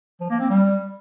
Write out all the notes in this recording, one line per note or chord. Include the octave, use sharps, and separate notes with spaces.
F3
A#3
C4
G3